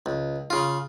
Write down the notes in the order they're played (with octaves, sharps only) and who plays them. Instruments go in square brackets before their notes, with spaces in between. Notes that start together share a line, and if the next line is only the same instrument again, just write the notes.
[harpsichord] C#2
C#3 F4